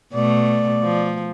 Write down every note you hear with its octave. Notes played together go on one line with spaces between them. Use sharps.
B2 A3 D5
F3